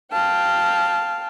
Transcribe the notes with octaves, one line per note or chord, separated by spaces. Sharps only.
F5 G5 A5